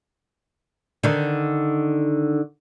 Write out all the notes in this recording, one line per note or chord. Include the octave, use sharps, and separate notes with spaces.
D3 D#3